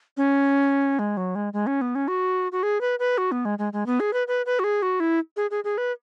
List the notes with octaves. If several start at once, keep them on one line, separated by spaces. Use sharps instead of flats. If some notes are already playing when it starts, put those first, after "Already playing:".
C#4
G#3
F#3
G#3
G#3
C#4
B3
C#4
F#4
F#4
G#4
B4
B4
F#4
B3
G#3
G#3
G#3
B3
G#4
B4
B4
B4
F#4
G#4
F#4
E4
G#4
G#4
G#4
B4